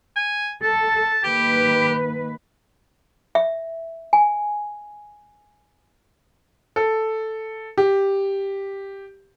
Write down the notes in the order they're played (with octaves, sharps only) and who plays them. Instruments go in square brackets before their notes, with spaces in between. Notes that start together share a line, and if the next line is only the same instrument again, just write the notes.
[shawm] G#5
[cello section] A4 [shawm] A5
[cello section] D#3 A#3 B4 [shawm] G4
[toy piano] E5
G#5
[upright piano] A4
G4